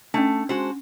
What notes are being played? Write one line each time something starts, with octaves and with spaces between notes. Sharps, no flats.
A3 C#4 D4
G#3 F#4 C5